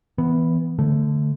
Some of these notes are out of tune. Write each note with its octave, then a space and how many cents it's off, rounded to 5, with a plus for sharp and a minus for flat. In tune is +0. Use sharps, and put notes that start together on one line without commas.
E3 +0 B3 +0
D3 -5 A3 +0